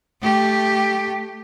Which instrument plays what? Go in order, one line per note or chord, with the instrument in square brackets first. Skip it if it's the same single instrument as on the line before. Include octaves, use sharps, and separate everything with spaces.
[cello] A3 G4